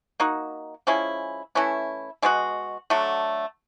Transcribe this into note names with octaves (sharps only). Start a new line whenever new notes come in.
A#3 D#4 F#4
F3 G#3 C#4 E4
E3 A3 C#4 E4
B2 G#3 C#4 F#4
D3 F#3 A3